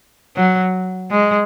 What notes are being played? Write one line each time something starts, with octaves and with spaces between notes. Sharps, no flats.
F#3
G#3